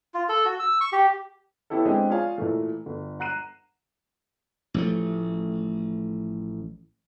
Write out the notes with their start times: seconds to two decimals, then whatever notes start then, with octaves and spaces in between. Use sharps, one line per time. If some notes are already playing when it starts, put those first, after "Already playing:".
0.14 F4
0.29 A4
0.45 F#4
0.59 E6
0.81 C#6
0.92 G4
1.70 B3 C#4 E4 G4 A4
1.85 G#3 B3 C4 D4 G4 G#4
2.09 F4 G#4 C#5 D5 F5 G#5
2.38 A#2 E3 A3
2.86 G1
3.20 F#5 A#5 F#6 C7 D#7 E7
4.74 A1 F3 A3